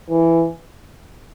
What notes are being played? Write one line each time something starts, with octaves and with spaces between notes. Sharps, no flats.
E3